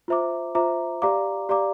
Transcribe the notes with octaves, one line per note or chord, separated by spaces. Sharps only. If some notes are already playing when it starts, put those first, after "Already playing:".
F4 C5 E5 A#5 D6
F4 C5 E5 A#5 D6
G4 D5 F5 A#5 D6
G4 D5 F5 A#5 D6